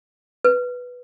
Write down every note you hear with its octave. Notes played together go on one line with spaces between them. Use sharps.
B4